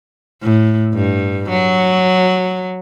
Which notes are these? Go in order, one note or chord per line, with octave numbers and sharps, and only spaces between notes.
A2
G2
F#3